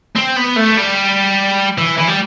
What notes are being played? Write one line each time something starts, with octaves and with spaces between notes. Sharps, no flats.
C4
B3
A3
G3
E3
E3
G3